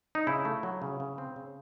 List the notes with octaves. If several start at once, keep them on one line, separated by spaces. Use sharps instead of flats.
D#4
C#3 E4
A3
F#3
C#3
C#3
C4
C#3